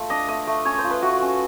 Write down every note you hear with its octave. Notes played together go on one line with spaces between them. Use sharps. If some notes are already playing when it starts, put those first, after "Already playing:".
Already playing: A3 F4
D4 D#5
A3 D#5
A3
C#4 C#5
C5
F4
B4
A3 F#4
C#4